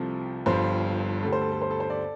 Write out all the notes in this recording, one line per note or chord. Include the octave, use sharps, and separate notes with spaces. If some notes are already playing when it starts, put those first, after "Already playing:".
Already playing: C2 C3 F3 A4
G1 G2 F3 C5
D2 D3 G3 A4
C5
A4
A4
C5
A4
C5
A4 D5